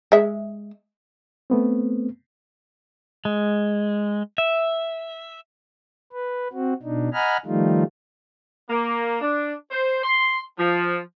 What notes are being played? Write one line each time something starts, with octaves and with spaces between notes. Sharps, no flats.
G#3 E5
A3 B3 C4
G#3
E5
B4
C4 F#4
B2 D4 D#4
D#5 F#5 G#5 A#5 B5 F6
D#3 F3 G3 A3 D#4 F4
A#3
D4
C5
C6
F3